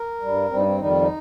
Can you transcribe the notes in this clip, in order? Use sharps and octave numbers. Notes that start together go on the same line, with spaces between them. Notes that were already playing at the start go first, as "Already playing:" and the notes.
Already playing: A#4
G2 G3
G2 G3 C4
D#4
C4
F2 D#3 G3 D#4
C4
D#4